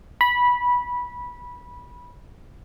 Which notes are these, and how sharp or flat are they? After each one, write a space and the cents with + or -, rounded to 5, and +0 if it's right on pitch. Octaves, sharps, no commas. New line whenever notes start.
B5 -15